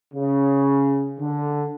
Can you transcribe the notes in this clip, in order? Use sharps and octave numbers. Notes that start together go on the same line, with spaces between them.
C#3
D3